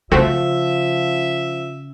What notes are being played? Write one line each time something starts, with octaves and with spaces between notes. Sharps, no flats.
C#3 F3 A3 C4 F#4 E5